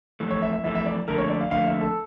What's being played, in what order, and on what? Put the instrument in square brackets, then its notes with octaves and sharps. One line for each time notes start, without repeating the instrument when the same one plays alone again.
[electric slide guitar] F2 E3 A3
[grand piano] C#5
E5
E5
[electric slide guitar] F2 E3 A3 [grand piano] E5
[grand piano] E5
D5
[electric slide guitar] F2 D3 A3 [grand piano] A#4
[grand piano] C#5
D5
F5
[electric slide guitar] F2 D3 A3 [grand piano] F5
[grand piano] E5
A4